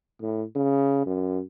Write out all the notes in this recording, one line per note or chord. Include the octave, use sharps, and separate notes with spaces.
A2
C#3
F#2